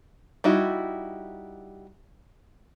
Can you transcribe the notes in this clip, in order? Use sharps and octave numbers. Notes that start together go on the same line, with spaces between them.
G3 D#4 E4 F#4